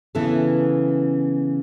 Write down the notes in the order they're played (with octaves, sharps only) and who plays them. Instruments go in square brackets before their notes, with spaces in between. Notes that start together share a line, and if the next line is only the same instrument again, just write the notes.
[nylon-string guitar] C#3 E3 B3 E4 A4